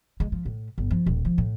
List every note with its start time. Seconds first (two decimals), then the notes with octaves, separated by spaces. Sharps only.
0.20 G#3
0.32 F3
0.45 A2
0.78 G1
0.90 F3
1.06 D#1
1.25 F3
1.38 A2